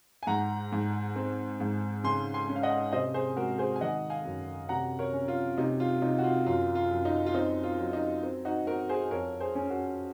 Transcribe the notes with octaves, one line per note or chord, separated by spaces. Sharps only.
G#5
G#2 F#5 A#5
G#2
C4
G#2
C#3 G#5 C6
G#5 C6
C#4
F5
D#5 F#5
C3 C5 D#5
G#4 C5
G#3 F#4 A#4
G#4 C5
G#5
D#3 D#5 F#5
F5 G#5
F#2
C3 F#5 A#5
A#4 C#5
C#4
F4
C3 D#4
F4
C3 D#4
F#4
F4
F#2 F4
F4
F#2
D#4
F4
C4 D#4
F4
F#3
D#4
C4
D#4 F#4
C4 F#4 A#4
G#4 C5
F2 A#4 C#5
G#4 C5
C#4
F#4 A#4